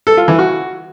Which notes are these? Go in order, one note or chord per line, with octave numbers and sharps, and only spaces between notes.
A4
F4
E3
F#4